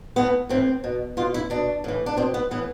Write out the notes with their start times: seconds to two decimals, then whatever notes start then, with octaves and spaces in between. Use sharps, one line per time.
0.16 A2 E3 B3
0.49 A2 E3 C4
0.84 B2
1.17 B2 F4
1.34 E4
1.50 B2 D4
1.84 A2 E3
2.06 D4
2.17 B2 C4
2.34 B3
2.51 A2 E3 B3